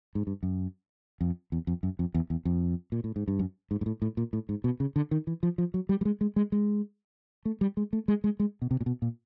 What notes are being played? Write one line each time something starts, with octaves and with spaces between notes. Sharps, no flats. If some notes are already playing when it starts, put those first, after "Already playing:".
G#2
G2
F#2
F2
E2
F2
F#2
F2
E2
E2
F2
A#2
A2
G#2
G2
F#2
G#2
G#2
A2
A2
A#2
A2
G#2
B2
C#3
D3
D#3
E3
F3
F3
F#3
G3
G3
G#3
G#3
G#3
G#3
A3
G3
G#3
A3
G#3
G#3
G#3
B2
C3
A#2
B2
A#2